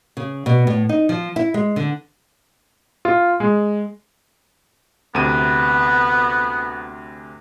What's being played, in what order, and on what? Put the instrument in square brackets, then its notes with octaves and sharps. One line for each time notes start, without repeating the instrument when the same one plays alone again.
[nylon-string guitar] C#3
B2
A2
D#4
F3
E4
G#3
D3
[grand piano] F4
G#3
[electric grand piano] D2 C3 D#7 [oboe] B3